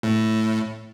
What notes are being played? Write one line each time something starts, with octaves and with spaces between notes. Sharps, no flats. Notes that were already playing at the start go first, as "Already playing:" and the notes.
A2